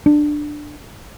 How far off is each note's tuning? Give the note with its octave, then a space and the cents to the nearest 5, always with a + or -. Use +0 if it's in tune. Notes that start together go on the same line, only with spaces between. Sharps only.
D4 +15